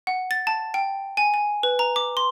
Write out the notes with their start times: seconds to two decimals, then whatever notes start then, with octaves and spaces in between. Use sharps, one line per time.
0.07 F#5
0.31 A6
0.47 A5
0.74 G5
1.17 G#5
1.34 G#5
1.63 B4
1.79 A#5
1.96 D6
2.17 C6